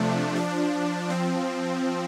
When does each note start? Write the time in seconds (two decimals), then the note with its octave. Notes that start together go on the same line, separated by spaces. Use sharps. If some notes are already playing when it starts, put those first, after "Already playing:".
Already playing: C3 F3 A3 D4
0.36 F3 D4
1.10 F3 C4